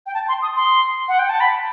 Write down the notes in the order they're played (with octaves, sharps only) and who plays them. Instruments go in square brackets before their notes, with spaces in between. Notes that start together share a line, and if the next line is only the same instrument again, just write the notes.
[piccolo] G5
A5
C6
D#6
C6
F#5
G5
A5
B5